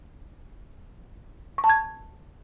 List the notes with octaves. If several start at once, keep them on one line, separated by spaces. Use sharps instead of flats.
C#6
A5
G#6